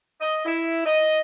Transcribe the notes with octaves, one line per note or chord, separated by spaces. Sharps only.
D#5
E4
D#5